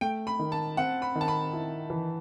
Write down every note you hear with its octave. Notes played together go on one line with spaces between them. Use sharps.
A3 G5
B5
D#3
A5
C4 F#5
B5
D#3
A5
B5
E4
E3